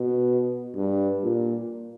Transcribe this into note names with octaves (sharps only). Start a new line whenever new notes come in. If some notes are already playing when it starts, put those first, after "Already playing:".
Already playing: B2
G2
A#2